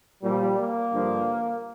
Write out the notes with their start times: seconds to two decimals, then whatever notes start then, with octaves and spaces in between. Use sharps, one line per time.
0.21 A#2 F3 G3
0.57 A#3
0.92 G2 D3 F3